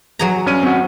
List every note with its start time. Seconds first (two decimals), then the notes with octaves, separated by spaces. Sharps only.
0.19 F#3 G#4 A#5
0.46 G2 C#4 D#7
0.63 C4 F#4